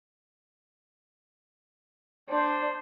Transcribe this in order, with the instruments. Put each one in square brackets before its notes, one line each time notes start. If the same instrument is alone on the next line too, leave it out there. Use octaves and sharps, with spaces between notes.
[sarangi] D4 [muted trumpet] C5